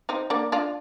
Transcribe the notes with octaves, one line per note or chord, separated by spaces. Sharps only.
C4 D#4
A#3 D4
D4 F4